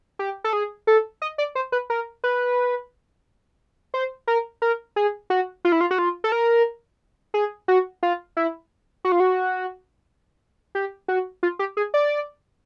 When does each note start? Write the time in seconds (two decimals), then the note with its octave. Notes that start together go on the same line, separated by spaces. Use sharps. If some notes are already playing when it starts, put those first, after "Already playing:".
0.19 G4
0.44 A4
0.53 G#4
0.87 A4
1.22 D#5
1.38 D5
1.55 C5
1.72 B4
1.90 A#4
2.24 B4
3.94 C5
4.27 A#4
4.62 A#4
4.96 G#4
5.30 F#4
5.65 F4
5.72 E4
5.81 F4
5.91 F#4
5.98 F4
6.24 A4
6.32 A#4
7.34 G#4
7.68 F#4
8.03 F4
8.37 E4
9.05 F#4
9.12 F4
9.20 F#4
10.75 G4
11.08 F#4
11.43 F4
11.59 G4
11.77 G#4
11.94 D5